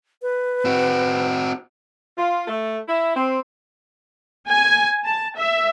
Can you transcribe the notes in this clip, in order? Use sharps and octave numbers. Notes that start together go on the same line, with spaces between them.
B4
C4 F#4
F4
A3
E4
C4
G#5
A5
E5